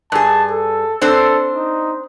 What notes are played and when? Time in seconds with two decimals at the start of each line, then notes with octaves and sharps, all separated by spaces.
0.12 G2 G#4 A5
0.50 A4
1.02 C4 D4 A4 C5
1.54 D#4